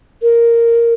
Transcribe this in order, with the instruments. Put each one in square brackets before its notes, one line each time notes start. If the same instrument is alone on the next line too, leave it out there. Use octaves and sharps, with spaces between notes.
[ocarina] A#4